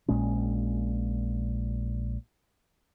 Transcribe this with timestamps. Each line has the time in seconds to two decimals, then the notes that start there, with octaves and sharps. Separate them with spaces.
0.08 A#1 A#2 G#3 C#4